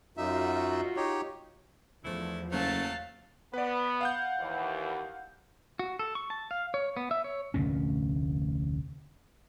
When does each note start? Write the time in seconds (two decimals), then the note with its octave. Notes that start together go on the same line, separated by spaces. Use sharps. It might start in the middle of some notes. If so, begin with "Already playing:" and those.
0.17 F#2 D#4 F4 F#4 E5
0.97 D#4 G4 C#5
2.05 E2 F3 A3 D4 E4
2.52 F#1 F#3 A3 F5 A5
3.54 B3 B4 D5
4.01 F5 F#5 G6
4.39 D#2 E3
5.79 F#4
5.99 A4
6.15 C#6
6.30 A5
6.51 F5
6.74 C#5
6.97 B3
7.11 E5
7.24 C#5
7.54 F1 D2 A#2 C#4